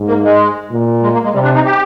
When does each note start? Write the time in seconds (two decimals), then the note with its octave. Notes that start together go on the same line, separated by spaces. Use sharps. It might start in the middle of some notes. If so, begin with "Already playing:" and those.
Already playing: G#2
0.08 A#3
0.24 G#3
0.71 A#2
1.03 G#3
1.13 A#3
1.24 G#3
1.34 C3 G3
1.44 D4
1.54 D#4
1.65 G4